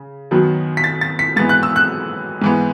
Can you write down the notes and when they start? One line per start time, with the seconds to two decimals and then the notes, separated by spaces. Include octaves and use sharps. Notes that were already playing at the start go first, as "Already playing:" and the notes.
Already playing: C#3
0.31 F#2 D#3 F#3 B3
0.77 B6
0.84 A6
1.01 A6
1.19 B6
1.36 G#2 E3 B3 A6
1.49 F#6
1.63 E6
1.76 F#6
2.42 G#2 E3 B3